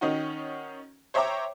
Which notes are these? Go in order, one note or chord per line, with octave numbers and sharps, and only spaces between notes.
D#3 C#4 D#4 F#4
C5 C#5 E5 G5 A#5 D6